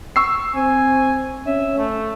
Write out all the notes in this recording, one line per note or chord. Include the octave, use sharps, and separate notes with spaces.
C#6 E6 C7
C4 G#5
C#4 E5
A3